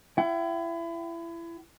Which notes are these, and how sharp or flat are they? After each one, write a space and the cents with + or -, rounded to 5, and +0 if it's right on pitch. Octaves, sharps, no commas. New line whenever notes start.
E4 +30 G5 -45